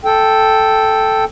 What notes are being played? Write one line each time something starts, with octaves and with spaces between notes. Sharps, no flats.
A4 G5